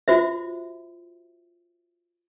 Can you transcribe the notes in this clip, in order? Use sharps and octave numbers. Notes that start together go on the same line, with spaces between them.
F4 F#4 C5 E5